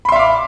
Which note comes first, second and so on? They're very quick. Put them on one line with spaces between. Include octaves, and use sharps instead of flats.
B5 C6 E5 F5 D6